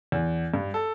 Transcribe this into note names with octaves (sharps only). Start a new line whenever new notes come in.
E2
G2
A4